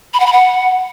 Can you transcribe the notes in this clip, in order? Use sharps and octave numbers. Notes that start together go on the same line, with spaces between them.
B5
F#5
B5
F#5